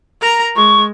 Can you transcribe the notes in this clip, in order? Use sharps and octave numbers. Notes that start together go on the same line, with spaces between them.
A#4 A#5
G#3 C#6